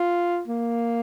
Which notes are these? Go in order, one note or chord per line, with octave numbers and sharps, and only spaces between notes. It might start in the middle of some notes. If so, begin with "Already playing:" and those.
Already playing: F4
A#3